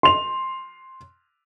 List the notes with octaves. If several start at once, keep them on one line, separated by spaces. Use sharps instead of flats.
C6 F7